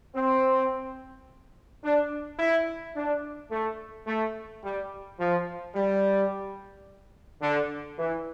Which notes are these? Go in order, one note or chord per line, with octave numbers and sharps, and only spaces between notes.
C4
D4
E4
D4
A3
A3
G3
F3
G3
D3
E3